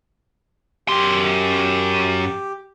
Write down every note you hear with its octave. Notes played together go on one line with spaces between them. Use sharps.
F#2 G4 C6